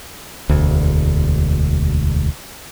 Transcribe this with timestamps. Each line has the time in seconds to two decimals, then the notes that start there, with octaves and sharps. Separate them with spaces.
0.49 E1 D2